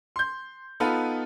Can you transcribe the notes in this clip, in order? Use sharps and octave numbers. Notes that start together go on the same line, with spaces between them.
C6 G6
B3 D#4 F4 A4 B4